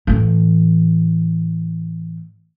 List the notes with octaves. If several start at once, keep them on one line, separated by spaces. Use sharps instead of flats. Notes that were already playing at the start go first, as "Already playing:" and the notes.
A2 E3